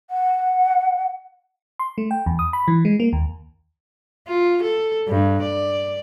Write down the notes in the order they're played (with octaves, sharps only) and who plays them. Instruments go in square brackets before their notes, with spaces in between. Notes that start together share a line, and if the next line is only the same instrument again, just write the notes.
[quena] F#5
[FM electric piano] C6
A3
G5
E2
D#6
B5
E3
G#3
A#3
D#2
[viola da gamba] F4
A4
G2
D5